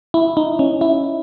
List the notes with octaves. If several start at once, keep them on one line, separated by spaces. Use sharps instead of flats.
E4
D#4
C#4
E4